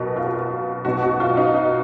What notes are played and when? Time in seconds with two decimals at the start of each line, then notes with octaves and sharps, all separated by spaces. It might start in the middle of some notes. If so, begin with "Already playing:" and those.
Already playing: B1 B2 F#4 A#4 B4
0.16 F4
0.25 F#4
0.34 F4
0.85 B1 B2 F#4
1.03 F#4
1.20 F4
1.37 D#4
1.55 D#4